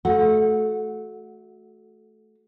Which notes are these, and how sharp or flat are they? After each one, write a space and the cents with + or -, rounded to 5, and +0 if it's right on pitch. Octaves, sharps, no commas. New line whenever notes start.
A3 -20 F#4 +0 F#5 -20